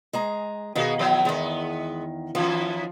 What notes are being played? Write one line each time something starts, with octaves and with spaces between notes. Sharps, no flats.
G#3 G#4 A#5
B2 D#3 B3 F#4 G#4 F5
E3 F3 B3
E2 D#3 G#3 B3
F#2 D#3 F3 B3